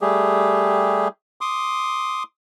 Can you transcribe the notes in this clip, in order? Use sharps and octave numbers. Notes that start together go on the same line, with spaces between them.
G3 A3 G4 G#4
C6 D6 D#6